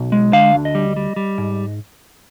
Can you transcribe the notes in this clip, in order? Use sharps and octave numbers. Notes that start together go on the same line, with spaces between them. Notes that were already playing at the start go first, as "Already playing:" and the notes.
Already playing: B1
G#3
D3 F5
D2
D#5
G3
G3
G3
G#2